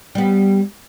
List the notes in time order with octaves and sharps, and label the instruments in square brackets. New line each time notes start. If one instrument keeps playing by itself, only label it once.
[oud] G3 B3